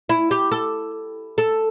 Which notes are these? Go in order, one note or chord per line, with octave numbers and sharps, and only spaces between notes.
E4
G4
A4
A4